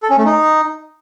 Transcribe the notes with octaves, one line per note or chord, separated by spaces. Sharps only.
A4
C#4
A3
D#4